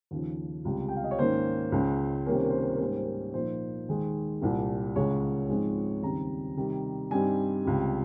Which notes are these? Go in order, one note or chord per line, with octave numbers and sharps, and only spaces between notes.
D#2 C#3 F3
C#2 C3 G3
G5
F5
D#5
C#5
G#2 D#3 A#3 C#4 C5
C#2 C#3 G#3
C3 D#3 G3 A#3 C#4 A#4
C5
A#4
C5
A#4
C5
A#4
G#2 G3 A#3 C#4 C5
A#4
C5
A#4
A#2 F3 A#3 D#4 C5
D#2 D#3 G#3
C2 A#2 G3
C#2 C#3 G#3 C#4 C#5
G#2 F3 G#3 C4
D#2 C#3 G3 C4 A#5
C3 D#3 G3
G2 G3 C4 D#4 G#5
C#2 C3 G3